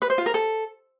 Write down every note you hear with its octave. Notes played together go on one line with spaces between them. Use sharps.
B4
C5
F4
A#4
A4